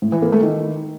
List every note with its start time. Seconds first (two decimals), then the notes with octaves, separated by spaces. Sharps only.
0.02 A2
0.12 E3
0.22 A#3
0.32 A3
0.42 D#3